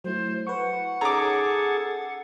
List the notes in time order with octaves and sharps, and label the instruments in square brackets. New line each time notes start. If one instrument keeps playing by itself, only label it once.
[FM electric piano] F#3 A3 E4 [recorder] C5
[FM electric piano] B4 C#6 [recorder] F#5
[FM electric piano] C#4 D#4 [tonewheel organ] G#4 A4 [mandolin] A#5 D6